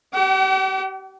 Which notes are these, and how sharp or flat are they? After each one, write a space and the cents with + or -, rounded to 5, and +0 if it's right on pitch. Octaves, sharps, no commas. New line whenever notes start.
G4 -35 F#5 +45